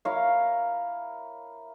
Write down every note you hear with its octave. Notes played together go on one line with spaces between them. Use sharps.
E4 A#4 C#5 F5